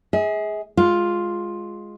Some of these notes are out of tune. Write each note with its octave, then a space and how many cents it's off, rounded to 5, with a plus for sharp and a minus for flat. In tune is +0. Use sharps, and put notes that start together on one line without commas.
G#4 +0 E5 -45
G#3 +0 F4 +5